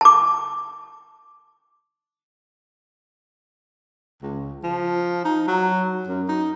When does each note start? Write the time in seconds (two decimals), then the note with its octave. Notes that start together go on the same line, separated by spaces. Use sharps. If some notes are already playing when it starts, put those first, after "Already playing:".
0.01 A5 D6
4.22 C#2
4.64 F3
5.25 D#4
5.47 F#3
6.08 F#2
6.28 D#4